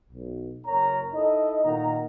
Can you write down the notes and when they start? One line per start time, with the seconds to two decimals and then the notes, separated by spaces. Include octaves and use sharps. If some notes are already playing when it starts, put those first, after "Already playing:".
0.12 B1
0.67 F#1 A#4 C#5 A#5
1.14 D#4 E4 A4 D#5
1.65 A#2 D#3 A#3 D#4 F#5 A#5